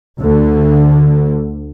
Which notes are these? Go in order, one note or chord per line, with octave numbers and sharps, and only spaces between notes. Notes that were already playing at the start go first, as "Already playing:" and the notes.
D2 D3